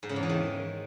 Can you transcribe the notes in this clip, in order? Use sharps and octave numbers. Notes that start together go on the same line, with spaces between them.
G#2
C#3
E2
E3
D#3